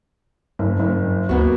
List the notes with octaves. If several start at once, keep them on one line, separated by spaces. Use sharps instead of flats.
F#1 G2
F#1
D2 A#3 B3 F#4